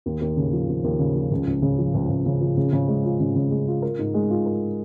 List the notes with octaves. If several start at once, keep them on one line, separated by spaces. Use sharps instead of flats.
D#2
D#2
C#3
F3
D#2
D#2
C#3
F3
C#2
C#2
C#3
F3
C#2
C#2
C#3
F3
C#3
C#3
G#3
F4
C#3
C#3
G#3
F4
A#4
G#2
G#3
F4
A#4